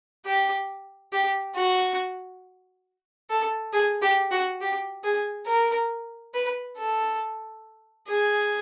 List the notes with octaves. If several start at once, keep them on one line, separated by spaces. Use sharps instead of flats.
G4
G4
F#4
A4
G#4
G4
F#4
G4
G#4
A#4
B4
A4
G#4